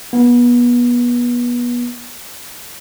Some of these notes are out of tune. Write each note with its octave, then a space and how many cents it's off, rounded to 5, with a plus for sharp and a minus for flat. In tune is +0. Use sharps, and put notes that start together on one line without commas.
B3 -30